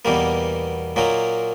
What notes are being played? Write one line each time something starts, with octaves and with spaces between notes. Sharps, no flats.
E2 B2 G3 A#3
A#2 F#3 A#3 D#4